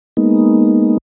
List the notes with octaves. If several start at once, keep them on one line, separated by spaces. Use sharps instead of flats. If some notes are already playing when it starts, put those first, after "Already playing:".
G#3 A#3 B3 D#4